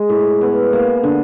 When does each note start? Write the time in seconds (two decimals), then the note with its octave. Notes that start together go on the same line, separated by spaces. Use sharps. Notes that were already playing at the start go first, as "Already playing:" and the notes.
Already playing: G#3
0.09 A2
0.41 B3
0.73 A#3
1.03 D3